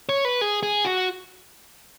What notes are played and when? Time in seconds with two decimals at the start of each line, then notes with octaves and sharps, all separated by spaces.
0.09 C#5
0.25 B4
0.41 G#4
0.63 G#4
0.85 F#4